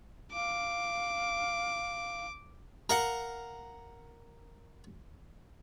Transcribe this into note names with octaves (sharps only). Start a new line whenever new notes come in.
F5 D6
A#4 F5 F#5